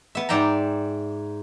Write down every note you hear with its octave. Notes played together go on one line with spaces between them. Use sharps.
B3 E5
G#2 D5 E5 G5 A#5